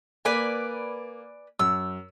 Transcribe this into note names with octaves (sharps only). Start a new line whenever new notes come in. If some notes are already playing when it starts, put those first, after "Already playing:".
A#3 B4 D5 G#5
F#2 E6